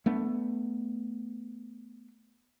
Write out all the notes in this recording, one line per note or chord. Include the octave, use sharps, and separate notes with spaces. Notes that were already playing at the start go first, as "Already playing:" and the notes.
A3 B3 D4